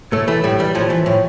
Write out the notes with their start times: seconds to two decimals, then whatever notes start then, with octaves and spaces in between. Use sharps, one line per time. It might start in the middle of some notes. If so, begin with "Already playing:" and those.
0.12 A2 A3
0.28 E3 A3
0.44 A2 G3
0.59 E3 G3
0.75 A2 F3
0.90 E3
1.06 A2